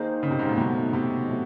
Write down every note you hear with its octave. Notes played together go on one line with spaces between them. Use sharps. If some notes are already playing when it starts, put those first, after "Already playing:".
Already playing: D#3 A#3 D#4 G#4 C5
C#3
C3
G#2
A#2
B2 D#3 F#3 A3
C3
A2 F#3 A3